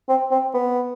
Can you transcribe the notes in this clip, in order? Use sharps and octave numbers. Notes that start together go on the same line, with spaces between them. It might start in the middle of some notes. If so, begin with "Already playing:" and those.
C4
C4
B3